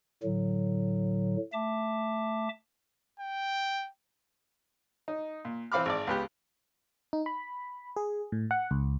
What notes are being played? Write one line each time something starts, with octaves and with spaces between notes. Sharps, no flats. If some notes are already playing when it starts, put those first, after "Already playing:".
A2 D3 F#3
A3 E5 A5 D6
G5
D#4
A#2
E3 C4 F5 B5 D6 F6
G#1 D5
C#2 B3 G4
D#4
B5
G#4
A2
F#5
C#2